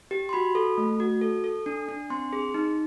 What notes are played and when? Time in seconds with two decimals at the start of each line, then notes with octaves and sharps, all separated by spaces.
0.11 G4
0.29 C6
0.33 F#4 B5
0.55 A4
0.78 A3
1.00 F#4
1.21 A4
1.44 A4
1.66 D4
1.89 D4
2.10 C4 C6
2.33 G#4
2.54 D#4